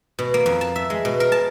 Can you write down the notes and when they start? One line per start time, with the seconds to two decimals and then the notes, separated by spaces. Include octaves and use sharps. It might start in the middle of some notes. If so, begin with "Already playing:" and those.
0.19 B2
0.34 A#3
0.46 F2
0.61 A5
0.76 E5
0.90 G#3
1.05 B2
1.20 A#4
1.32 A5